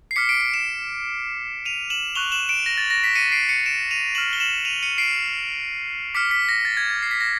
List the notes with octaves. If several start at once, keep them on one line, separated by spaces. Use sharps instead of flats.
C7
D6 F6 B6 C#7
C7 D7
C7 D7
D7 E7
D#7 F7
E7 F#7
C#6 F#6 F7 G7
E7 F#7
D7 E7
A#6
A6
A#6
B6
C#7 D#7
C7 D7
C#7 D#7
D7 E7
D#7 F7
C#6 F6 E7 F#7
G7
E7 F#7
D#7 F7
C#7 D#7
C7 D7
D6 F6 B6 C#7
B6
A#6
A6
G#6
A6
C7
B6
A#6